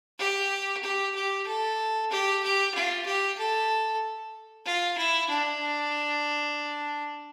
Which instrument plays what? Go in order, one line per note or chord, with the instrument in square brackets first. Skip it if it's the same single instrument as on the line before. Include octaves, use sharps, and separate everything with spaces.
[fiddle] G4
G4
G4
A4
G4
G4
F4
G4
A4
F4
E4
D4